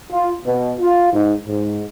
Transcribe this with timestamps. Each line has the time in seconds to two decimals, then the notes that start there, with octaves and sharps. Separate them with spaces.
0.12 F4
0.45 B2
0.80 F4
1.13 G#2
1.46 G#2